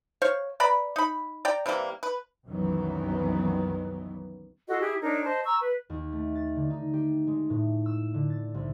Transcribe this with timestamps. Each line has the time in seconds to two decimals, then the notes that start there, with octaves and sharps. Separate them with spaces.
0.22 C5 C#5 F5
0.60 B4 D5 A#5 B5
0.96 D#4 B5
1.45 D5 G5 A#5
1.66 C3 E3 G3 A#3
2.03 B4
2.47 C2 F#2 D#3 E3 F#3 B3
4.67 F4 F#4 A4 D#5
4.80 E4 G4 G#4
5.02 D4 D#4 A#4 C#5
5.24 C5 D#5 A5
5.45 A#5 C#6 E6
5.59 B4
5.90 D#2
6.12 A3
6.35 A6
6.56 D3
6.70 D#4
6.93 G4
7.27 G#3
7.50 A2
7.86 E6
8.14 D3
8.30 A6
8.54 C2